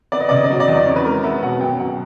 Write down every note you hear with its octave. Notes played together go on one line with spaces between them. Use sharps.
B3 D5
D#5
C#3 D5
D#5
D5
F#3 D#5
D5
E2 D#5
D5
C#4
B4
G#3 A#4
B3 E5
B2 F#5
F#2 G5
F#2 F#5